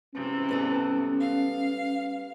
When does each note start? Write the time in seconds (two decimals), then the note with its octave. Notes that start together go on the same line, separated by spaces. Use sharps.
0.14 G#2 C3 E3 C#4
0.49 G3 B3 A4
1.21 F5